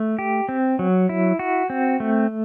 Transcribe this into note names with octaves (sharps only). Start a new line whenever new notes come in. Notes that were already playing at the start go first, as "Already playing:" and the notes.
Already playing: A3
G4
C4
F#3
E4
F#4
C4
A3